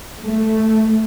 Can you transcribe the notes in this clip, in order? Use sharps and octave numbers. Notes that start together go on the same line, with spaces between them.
A3